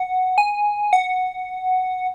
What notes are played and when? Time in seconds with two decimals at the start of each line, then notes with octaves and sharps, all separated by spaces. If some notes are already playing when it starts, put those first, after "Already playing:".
Already playing: F#5
0.38 G#5
0.93 F#5